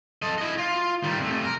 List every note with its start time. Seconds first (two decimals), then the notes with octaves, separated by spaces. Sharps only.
0.22 A4 D#5
0.38 E4 D#5
0.58 F4
1.03 D#3 G3
1.19 C3 A3
1.44 A#4